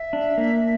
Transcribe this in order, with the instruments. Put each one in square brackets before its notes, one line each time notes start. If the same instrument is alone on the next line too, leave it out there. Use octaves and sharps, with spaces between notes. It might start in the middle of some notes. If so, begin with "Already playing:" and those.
Already playing: [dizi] E5
[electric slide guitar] D4
A#3